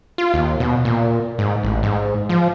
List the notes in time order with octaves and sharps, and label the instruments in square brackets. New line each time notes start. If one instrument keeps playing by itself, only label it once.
[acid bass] F4
D#2
B2
A#2
G#2
A1
G#2
F3